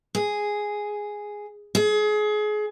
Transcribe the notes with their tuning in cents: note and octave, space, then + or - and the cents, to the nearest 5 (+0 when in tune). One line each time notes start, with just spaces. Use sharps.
G#4 +0
G#4 +30